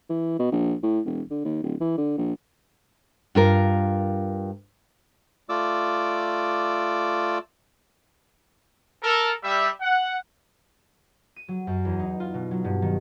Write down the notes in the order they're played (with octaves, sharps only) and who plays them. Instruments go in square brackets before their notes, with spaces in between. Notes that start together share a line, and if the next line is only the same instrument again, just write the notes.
[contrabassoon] E3
B2
A#1
A2
E1
D3
D#2
D1
E3
D3
A#1
[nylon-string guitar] G2 F4 A#4
[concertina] A3 F4 D5 D6 E6
[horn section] A4 A#4
G3 E5
F#5
[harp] D#7
F#3
F#2
E2
D#4
F4
B2
F#3
G2
D#3